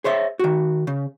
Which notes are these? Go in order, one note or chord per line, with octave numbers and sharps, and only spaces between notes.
G#4 C5 C#5 E5
D#3 F#4
C#3